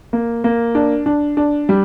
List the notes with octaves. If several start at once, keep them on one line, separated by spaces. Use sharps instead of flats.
A#3
A#3
D4
D4
D4
G3